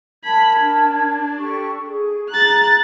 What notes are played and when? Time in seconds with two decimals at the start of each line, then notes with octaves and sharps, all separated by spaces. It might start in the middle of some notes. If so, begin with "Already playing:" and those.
0.24 A#4 A5 B5 G#6
0.60 D4
1.38 G4 A4 C#6
1.87 G#4
2.29 G#4 A#5 F#6 A6